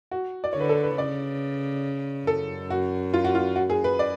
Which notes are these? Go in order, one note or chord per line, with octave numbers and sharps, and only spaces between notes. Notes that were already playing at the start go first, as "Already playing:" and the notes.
F#4
D5
D3 C#5
B4
A4
B4
C#3 D5
F#2 A4
F#4
F4
F#4
F4
F#4
G#4
B4
D5